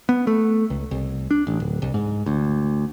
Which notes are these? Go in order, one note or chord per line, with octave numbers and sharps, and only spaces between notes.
B3
A3
C#2
C2
D4
A1
D1
C2
G#2
D2